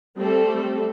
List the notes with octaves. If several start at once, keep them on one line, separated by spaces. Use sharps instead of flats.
G3 A3 C4 A4